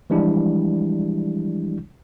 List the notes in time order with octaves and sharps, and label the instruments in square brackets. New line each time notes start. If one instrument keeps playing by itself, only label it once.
[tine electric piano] E3 F3 G3 G#3 D4 E4